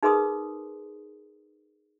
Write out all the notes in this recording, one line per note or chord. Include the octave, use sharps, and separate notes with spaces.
D#4 G#4 A#4 B4 C6 D#6